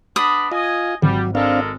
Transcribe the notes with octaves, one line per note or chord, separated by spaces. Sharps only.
B3 D4 B5 D#6
F4 D#5 G#5
G#1 F#3 G3
G#3 C4 D4 A4 A#4 F5